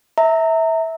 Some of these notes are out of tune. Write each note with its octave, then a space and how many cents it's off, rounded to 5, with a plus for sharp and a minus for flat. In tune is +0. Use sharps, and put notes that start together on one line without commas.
E5 -20 A#5 -30